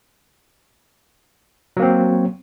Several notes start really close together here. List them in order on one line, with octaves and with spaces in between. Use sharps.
F#3 A#3 C4